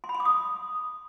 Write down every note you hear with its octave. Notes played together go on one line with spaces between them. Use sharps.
C6
B5
C6
D6
D#6